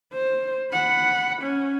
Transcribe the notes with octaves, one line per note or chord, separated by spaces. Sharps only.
C5
F#5 B5
C#4